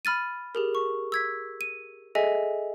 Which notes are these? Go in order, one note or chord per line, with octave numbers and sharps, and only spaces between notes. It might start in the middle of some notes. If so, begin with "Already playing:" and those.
B5 F6 A6 D#7
G4 G#4 A#4
C#6
E6 G#6 B6
D#7
G#4 A4 D#5 E5 G#5